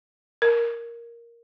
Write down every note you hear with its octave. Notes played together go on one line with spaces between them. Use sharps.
A#4